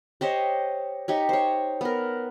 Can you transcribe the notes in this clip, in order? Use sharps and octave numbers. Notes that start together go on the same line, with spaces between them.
G4 C5 C#5 D#5
D#4 G4 C#5
C5 C#5
B3 A#4